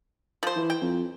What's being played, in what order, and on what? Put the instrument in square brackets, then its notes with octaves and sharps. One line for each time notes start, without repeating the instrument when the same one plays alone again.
[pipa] F3 C5
[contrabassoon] E3
[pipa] G5
[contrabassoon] F2